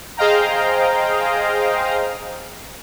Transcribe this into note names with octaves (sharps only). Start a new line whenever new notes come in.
G#4 C5 D#5 F5 G5 A#5